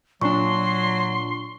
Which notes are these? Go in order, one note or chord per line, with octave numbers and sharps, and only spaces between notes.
A#2 F#3 D4 C6 C#6